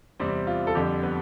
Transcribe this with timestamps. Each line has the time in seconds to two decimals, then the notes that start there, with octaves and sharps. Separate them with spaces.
0.20 E2 C3 G3 C4
0.47 F4
0.67 A4
0.75 F2 D3 G3 G4
1.03 B3 B4